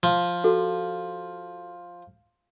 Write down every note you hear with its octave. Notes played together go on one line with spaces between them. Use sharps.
F3
F#4 A4